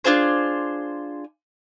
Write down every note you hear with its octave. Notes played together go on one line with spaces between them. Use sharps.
D4 F4 G#4 C5